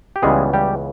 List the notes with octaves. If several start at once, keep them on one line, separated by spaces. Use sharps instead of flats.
G4
C#2 C#3 E3 G3 G#3 B3 G#4
G3 G4